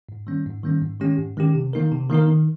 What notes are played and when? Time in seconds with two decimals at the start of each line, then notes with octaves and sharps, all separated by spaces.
0.09 G#2
0.27 D#3 G3 A#3 C#4
0.46 G#2
0.64 D#3 G3 A#3 C#4
0.82 G#2
1.00 D#3 G#3 C#4 G4
1.18 G#2
1.37 D#3 G#3 C#4 G4
1.55 C3
1.73 D#3 A#3 D#4 A#4
1.92 C3
2.10 D#3 A#3 D#4 A#4
2.28 D#3